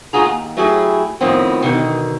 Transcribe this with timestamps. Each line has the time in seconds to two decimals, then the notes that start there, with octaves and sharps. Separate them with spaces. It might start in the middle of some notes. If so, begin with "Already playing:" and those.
0.13 D2 F4 F#4 G#4 A#5
0.25 D#2
0.57 F#3 A3 E4 G4 G#4
1.21 F2 A2 D#3 F3 B3 C4
1.62 B2 D3 D#3